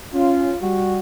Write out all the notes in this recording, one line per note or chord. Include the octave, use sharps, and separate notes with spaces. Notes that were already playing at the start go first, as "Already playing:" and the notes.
C#4 F4
G3 F#4